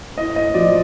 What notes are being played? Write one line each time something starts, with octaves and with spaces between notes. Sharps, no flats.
A2 D#5
D#5
F3 D5